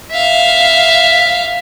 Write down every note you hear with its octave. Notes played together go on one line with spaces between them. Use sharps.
E5 F5